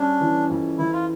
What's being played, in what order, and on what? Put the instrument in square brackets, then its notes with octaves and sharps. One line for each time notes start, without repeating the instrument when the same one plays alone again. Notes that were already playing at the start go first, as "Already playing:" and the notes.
Already playing: [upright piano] G3 C#4 [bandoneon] D4
[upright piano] E3
F2
[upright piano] E3 [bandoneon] E4
[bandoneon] F4